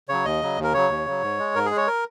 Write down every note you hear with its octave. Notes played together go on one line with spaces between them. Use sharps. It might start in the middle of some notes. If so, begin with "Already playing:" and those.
C#3 F#3 C#5
D#2 D#5
C#3 F#3
D#2
A#4
C#3 F#3 C#5
D#2
C#3 F#3
G#2
G#3
G#2 A#4
G#4
G#3
C#5
A#4